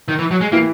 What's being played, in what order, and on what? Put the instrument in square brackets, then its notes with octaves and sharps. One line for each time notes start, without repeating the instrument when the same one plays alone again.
[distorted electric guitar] D#3
E3
F#3
G#3
[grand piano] E3 [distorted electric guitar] A#3